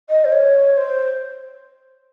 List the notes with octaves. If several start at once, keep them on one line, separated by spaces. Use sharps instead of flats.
D#5
C5
C#5
C5